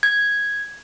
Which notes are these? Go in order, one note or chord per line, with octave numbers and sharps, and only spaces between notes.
G#6